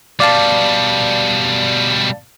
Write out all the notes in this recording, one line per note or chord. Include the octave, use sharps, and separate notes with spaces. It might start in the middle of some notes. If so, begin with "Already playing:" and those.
B2 G3 D5 F5 A5